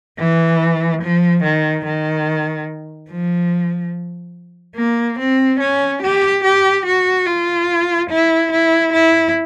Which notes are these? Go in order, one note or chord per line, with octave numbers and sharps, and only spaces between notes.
E3
F3
D#3
D#3
F3
A#3
C4
C#4
G4
G4
F#4
F4
E4
E4
E4